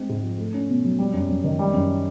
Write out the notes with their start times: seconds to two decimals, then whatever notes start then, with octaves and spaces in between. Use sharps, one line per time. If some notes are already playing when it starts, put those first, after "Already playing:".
Already playing: G#3 C4
0.09 G#2
0.23 F3
0.38 A3
0.54 C#4
0.69 B2
0.84 F#3
0.99 G3
1.13 F#2
1.29 F#2
1.44 D#3
1.59 G3
1.73 F#2